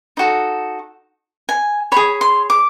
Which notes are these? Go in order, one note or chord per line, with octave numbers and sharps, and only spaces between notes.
D#4 F#4 A4
G#5
G#4 C#5 B5
C6
D6